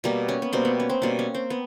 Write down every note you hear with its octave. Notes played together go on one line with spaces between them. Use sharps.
B2 G3 A#3
C#4
B3
B2 G3 A#3 C4
B3
C#4
C4
B2 G3 A#3 C#4
C#4
C4
B3